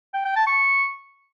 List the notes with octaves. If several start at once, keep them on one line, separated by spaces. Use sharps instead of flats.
G5
G5
A5
C#6